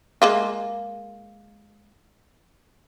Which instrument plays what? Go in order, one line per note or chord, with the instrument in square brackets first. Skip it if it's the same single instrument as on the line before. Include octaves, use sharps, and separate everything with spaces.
[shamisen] G#3 A#3 F4